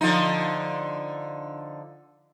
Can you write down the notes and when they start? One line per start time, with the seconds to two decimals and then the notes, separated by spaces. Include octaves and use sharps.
0.01 D3 F3 D#4